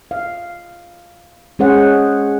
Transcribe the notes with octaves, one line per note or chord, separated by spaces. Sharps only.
F5
G#3 C#4 G#4 C5 C#5 F#5